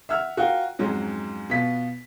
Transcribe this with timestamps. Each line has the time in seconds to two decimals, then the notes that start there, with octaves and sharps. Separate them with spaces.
0.09 E5 F#5 E6 F6
0.37 F4 F#4 A#4 F5 G5
0.79 F2 G#2 F#3 G#3 C#4
1.49 B2 B3 F4 B6